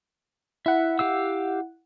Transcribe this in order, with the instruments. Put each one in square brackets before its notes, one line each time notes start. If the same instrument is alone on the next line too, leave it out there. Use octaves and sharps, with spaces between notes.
[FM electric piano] E4 F#5 [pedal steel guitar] E5
[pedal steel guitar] G4 F5 E6